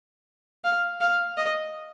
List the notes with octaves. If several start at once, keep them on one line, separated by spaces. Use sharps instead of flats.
F5
F5
D#5